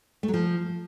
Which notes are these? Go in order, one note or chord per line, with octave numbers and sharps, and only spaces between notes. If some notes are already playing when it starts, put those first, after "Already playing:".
A3
F#3
F3